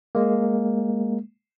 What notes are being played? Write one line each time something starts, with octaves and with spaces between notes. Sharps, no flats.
G#3 A#3